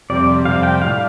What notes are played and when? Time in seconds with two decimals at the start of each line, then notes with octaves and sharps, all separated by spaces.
0.10 F2 C3 G3 D5
0.45 F2 C3 G3 F5
0.63 G5
0.81 A2 G3 D4 F5